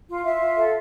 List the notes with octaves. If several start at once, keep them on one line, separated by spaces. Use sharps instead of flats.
F4
F4 E5
F4
A4